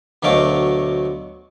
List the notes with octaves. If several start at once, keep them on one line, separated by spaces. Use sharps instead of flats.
D2 B2 F#3 A3 F5 D6